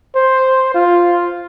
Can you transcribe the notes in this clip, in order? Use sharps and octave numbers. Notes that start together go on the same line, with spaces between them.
C5
F4